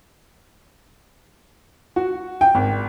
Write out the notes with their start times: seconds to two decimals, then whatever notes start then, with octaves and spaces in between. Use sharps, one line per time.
1.96 F#4
2.41 G5
2.55 G#1